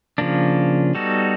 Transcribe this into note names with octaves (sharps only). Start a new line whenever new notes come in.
C#3 F3 A#3 D4
G3 B3 D#4 F#4 A4